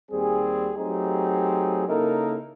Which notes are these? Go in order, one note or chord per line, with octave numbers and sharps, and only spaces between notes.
D#2 G3 C4 G#4
F#3 A3 C4 D#4 G4 G#4
C#3 A#3 D#4 E4 A4 A#4